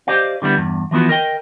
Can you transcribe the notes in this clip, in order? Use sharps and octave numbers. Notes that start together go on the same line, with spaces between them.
G4 C5 D5 D#5 F5
D3 G3 B3 E4
E2 G2
E3 F3 B3 E4 F#4
A#4 D#5 G5